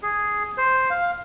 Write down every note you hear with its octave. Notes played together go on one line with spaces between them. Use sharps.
G#4
C5
F5